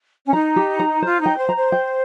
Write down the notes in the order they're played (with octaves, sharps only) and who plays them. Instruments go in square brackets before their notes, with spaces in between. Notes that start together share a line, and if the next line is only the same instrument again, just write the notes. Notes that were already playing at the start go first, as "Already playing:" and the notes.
[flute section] C#4
[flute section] D#4 [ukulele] A#5
[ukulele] G4
A#5
[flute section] F4 [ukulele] C5
[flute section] D#4
[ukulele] G5
[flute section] C5
[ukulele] A#5
[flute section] C5
[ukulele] G5